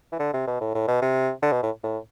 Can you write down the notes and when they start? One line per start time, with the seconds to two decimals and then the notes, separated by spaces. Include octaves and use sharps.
0.12 E3
0.19 D3
0.34 C3
0.47 B2
0.61 A2
0.74 A2
0.88 B2
1.02 C3
1.42 D3
1.53 B2
1.63 A2
1.83 A2